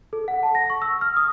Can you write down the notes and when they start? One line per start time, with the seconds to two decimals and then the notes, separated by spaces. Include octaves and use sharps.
0.13 A4
0.28 F#5
0.43 A5
0.55 A#6
0.70 C#6
0.82 E6
1.01 F6
1.17 D#6